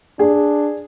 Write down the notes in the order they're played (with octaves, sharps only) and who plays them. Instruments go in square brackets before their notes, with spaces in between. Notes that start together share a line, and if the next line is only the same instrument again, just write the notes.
[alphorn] D4 [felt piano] G#4